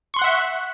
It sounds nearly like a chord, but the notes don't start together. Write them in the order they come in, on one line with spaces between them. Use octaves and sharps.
C#6 C6 F#6 F#5 E5